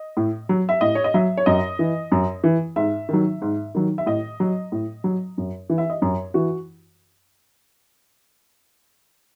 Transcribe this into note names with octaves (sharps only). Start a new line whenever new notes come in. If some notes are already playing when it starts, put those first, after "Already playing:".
Already playing: D#5
A2
F#3
E5
A2 D#5
C#5
D#5
F#3 E5
C#5
F#2 D#5
E3
F#2
E3
G#2 E5
D#3 F#3
G#2
D#3 F#3
E5
A2 D#5
F#3
A2
F#3
F#2
E3
E5
D#5
F#2 C#5
E3 F#4